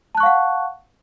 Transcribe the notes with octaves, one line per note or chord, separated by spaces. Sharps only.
F5 F#5 A5 C#6 F#6